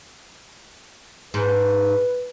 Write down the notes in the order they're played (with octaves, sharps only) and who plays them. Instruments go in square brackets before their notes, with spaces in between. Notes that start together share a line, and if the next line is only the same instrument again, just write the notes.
[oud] G#2 [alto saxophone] B4